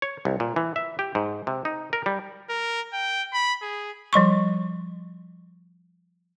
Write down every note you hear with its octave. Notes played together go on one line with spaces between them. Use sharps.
C#5
C2
A#2
E3
E5
G4
G#2
C3
D#4
A#4
G3
A#4
G5
B5
G#4
F3 G3 C6 C#6